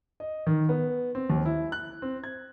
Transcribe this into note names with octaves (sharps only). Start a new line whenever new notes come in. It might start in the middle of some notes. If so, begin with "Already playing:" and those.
D#5
D#3
B3
C4
D#2
E4
F#6
C4
G#6